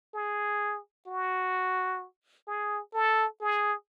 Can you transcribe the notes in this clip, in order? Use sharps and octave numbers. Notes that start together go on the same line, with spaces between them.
G#4
F#4
G#4
A4
G#4